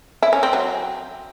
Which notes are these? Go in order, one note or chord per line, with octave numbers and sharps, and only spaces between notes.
E4
C#4
C4
F#3